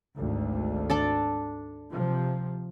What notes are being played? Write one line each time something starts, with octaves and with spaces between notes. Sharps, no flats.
G#1 D2
D4 A4 D5
C3 F3